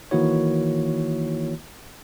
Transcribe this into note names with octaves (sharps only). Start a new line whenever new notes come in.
D#3 E3 A#3 E4 F#4 C#5